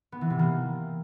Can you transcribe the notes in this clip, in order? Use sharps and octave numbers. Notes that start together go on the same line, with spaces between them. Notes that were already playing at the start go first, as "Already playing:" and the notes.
B3
E3
C3
A#3